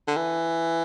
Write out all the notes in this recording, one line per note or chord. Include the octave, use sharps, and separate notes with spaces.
D3
E3